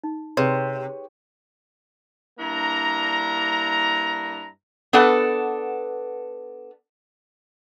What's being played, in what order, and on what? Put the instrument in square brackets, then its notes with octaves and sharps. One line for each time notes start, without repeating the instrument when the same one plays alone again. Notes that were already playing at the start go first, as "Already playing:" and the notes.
[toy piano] D#4
[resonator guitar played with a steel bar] C3 [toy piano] G#4 B4 C6 [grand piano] C#5
[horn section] G2 A#3 D4 E4 A#5
[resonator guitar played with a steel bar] B3 D4 A4 B4 F#5